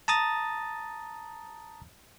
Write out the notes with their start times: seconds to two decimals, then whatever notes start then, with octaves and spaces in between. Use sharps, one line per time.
0.08 A5 A#5 D#6 A6